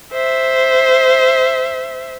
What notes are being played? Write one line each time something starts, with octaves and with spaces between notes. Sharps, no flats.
C5 E5